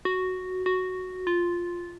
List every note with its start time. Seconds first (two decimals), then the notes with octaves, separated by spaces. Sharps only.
0.05 F#4
0.66 F#4
1.27 F4